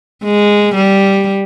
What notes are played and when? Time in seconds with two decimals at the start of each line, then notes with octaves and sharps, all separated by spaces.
0.24 G#3
0.76 G3